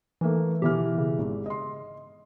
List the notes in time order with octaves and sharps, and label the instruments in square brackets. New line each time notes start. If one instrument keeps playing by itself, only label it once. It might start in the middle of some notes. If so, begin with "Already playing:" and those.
[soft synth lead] E3 [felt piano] A3 A#3 D#4
[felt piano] B2 E3 F6 [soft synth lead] G4
[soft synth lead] C#3
[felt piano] G#1
D#5 C6